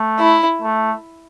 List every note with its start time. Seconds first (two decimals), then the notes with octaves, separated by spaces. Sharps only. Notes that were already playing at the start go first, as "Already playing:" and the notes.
Already playing: A3
0.19 E4
0.62 A3